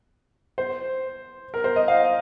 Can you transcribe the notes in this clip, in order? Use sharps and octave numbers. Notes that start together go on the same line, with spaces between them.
C5
A#4
C5
D#5
F5